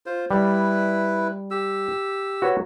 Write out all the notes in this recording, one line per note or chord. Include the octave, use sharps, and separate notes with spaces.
F4 C5
G3 E4 B4
G4 E6
F#4 B4 C#5